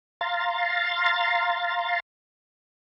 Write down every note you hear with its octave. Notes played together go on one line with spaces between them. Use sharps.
F5 A#5 C6 A6